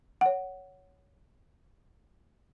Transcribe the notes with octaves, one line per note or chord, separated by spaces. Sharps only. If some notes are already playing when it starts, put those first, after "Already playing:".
C#5 F#5